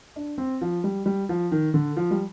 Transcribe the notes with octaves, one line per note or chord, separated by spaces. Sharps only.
D4
C4
F3
G3
G3
F3
D#3
D3
F3
G3